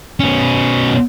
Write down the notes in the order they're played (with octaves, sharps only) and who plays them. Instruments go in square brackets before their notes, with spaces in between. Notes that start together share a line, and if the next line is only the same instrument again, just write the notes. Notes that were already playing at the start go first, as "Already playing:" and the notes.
[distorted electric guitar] B2 C#4